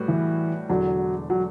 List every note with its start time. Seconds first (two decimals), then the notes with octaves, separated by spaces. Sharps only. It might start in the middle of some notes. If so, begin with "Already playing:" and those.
Already playing: A2 G3 F#4 B4
0.08 E3
0.69 E1 E2 D3 F#3
1.30 F#3